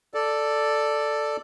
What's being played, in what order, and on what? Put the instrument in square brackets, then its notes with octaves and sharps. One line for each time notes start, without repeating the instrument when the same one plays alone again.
[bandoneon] A4 D5